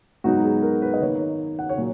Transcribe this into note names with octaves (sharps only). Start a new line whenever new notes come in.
G#2 F#3 B3 D#4 F#4
G#4
A#4
B4
D#5
D#3 A#3 D#4 C#5
F#5
C#5
A#2 F#3